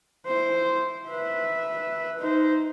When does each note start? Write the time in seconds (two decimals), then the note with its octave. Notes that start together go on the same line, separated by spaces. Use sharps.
0.26 E4 C5
1.09 B4 E5
2.19 D#4 C5